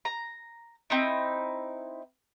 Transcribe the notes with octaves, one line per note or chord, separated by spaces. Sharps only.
A#5
C4 D#4 E4